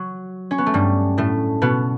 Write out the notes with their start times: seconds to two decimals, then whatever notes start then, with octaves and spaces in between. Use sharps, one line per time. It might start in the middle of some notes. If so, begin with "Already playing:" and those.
Already playing: F#3
0.51 C#4
0.58 B3
0.66 A3
0.74 G2 G3
1.18 A2 A3
1.62 B2 B3